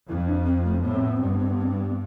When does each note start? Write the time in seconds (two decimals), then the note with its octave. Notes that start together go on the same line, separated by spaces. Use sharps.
0.08 F2 E4
0.27 D4
0.46 C4
0.65 A3
0.83 A2 B3
0.94 C4
1.05 B3
1.16 G2 C4
1.28 B3
1.39 C4
1.50 B3
1.61 C4
1.72 B3